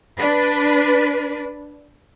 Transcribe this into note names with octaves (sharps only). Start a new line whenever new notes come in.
D4 B4